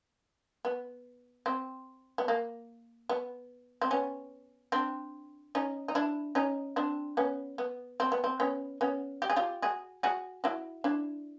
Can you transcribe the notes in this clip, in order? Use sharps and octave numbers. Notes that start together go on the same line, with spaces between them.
B3
C4
B3
A#3
B3
C4
B3 C#4
C4 D4
C#4 D#4
D#4
D4 E4
C#4 D#4
C4 D4
B3 C#4
B3
C4
B3
C4
B3 C#4
B3 C#4
G4
G#4
F4 G4
F#4 G#4
F#4 G#4
E4 F#4
D4 E4